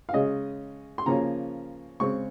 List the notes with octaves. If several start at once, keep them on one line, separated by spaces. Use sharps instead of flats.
F5
C#3 G#3 C#4 D#5
C6
C#3 F3 A#3 C#4 A#5
C#3 G#3 C4 C#6